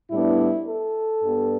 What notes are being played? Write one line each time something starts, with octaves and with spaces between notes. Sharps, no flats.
A2 G3 B3 D4 E4
A4
G2 G3 B3